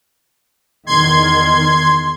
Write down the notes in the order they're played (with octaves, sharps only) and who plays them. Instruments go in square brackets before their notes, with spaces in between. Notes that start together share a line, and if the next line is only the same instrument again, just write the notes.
[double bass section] E2 D#3 [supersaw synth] C6 G#6